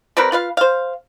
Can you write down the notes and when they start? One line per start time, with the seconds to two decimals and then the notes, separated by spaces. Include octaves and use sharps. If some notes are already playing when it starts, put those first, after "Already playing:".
0.17 G3 C4 A#4 B4
0.32 F4 B4 F5
0.57 C5 F5